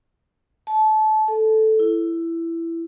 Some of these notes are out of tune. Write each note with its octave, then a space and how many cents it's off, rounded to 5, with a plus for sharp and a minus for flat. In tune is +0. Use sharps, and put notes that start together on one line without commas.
A5 -25
A4 -5
E4 +15